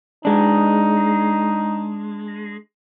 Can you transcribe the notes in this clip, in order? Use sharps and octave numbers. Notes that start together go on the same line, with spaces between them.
G#3 D4 D#4